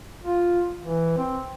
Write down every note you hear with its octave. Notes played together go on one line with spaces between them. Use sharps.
F4
E3
C4